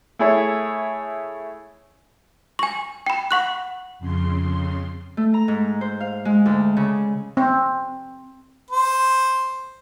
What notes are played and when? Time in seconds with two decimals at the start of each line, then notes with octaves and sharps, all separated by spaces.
0.19 A3 E4 G#4 C#5
2.59 G#5 C#6
3.06 G5 B5
3.31 F#5 C#6 F#6
3.99 F2 C#3 C6
5.17 A3
5.34 A#5
5.48 G#2
5.81 C5
6.00 F5
6.25 G#3
6.46 D2
6.77 C#3
7.37 C4
8.71 C5